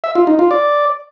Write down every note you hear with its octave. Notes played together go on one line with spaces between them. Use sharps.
E5
F4
D#4
F4
D5